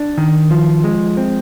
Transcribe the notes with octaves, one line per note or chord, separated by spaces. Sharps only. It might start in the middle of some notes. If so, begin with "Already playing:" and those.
Already playing: D4
D#3
F3
G#3
C4